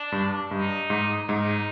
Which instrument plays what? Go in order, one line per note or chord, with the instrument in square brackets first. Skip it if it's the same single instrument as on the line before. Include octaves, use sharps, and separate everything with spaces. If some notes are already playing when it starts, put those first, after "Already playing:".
Already playing: [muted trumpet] D4
[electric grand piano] G2
[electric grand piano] G2 [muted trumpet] D#4
[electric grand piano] G#2
[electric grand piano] G#2 [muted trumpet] D#4